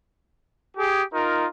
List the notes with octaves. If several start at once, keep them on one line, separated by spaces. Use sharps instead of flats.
G4 G#4
D#4 F4 A#4